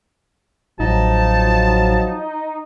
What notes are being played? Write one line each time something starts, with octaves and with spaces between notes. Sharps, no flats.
A1 F3 F#3 D#4 F4 A5